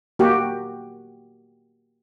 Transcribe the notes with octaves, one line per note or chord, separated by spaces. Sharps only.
A#3 F#4 G4